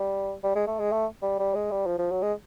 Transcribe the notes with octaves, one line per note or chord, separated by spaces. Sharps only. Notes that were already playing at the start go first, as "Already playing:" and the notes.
Already playing: G3
G3
G#3
A3
G#3
A3
G3
G3
G#3
G3
F3
F3
F#3
G#3